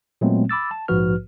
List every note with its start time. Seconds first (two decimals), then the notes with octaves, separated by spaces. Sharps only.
0.21 A#2 F#3 G#3 A3 B3 C4
0.49 B5 D6 E6 A6
0.71 A5
0.88 A#1 G#2 F3 F#4 B4 F6